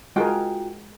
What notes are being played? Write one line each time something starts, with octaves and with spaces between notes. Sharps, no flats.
G#3 F4 F#4 G#4 A#4 G5